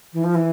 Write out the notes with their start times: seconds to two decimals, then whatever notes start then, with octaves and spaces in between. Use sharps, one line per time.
0.13 E3
0.24 F3
0.35 E3